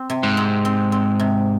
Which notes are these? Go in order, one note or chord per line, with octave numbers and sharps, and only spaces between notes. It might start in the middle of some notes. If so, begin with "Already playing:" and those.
Already playing: C4
C3
G#2
C4
C4
C4
C3